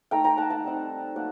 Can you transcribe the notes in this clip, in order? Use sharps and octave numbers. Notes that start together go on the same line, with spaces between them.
A3 D#4 G5 A#5
G5 A#5
F#5 A5
F#5 A5
G3 C4 D#4
F#3 A#3 D#4 D5 F#5